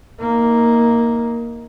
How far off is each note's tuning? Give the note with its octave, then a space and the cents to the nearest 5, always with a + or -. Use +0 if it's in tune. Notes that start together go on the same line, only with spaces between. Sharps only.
A#3 +0 D#4 +25